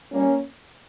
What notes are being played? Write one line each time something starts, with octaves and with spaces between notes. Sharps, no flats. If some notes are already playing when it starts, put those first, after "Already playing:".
A#2 G3 A#3 C#4